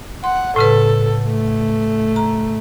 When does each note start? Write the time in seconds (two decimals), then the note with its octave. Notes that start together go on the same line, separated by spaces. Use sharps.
0.24 F#5 C6
0.56 A2 C#3 A4 B4
1.26 A3
2.16 A#5